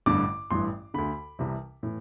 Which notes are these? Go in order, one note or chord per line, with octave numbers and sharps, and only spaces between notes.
A1 G2 D3 D6
A1 G2 E3 C6
D2 D3 B5
C2 C3 E3
A2 E3